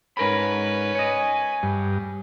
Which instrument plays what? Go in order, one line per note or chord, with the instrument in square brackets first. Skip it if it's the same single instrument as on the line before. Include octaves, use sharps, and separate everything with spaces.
[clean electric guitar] G#2 A#4 B5 [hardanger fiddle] C#4 B4
[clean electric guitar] C#5 D#5 [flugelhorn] G#5
[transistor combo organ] G2